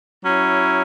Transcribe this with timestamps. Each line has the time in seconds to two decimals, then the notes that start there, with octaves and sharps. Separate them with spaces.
0.24 F#3 C#4 E4